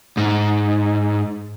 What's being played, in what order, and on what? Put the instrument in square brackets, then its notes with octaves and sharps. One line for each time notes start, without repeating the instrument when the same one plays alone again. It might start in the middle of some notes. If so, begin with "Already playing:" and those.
[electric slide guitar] G#2